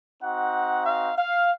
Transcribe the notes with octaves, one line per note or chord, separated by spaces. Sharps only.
C4 D#4 F#4 F#5
F5
F5